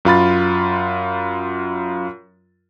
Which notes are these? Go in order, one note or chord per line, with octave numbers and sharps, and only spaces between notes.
F#2 F4 B5 A6